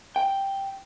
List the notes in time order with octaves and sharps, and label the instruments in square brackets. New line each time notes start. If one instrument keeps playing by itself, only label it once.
[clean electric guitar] G5